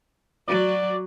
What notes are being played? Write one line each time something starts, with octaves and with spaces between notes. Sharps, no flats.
F#3 F#4 D5